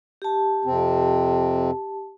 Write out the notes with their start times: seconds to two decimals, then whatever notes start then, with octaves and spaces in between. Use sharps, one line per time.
0.22 G4 A5
0.65 F2 C3 C4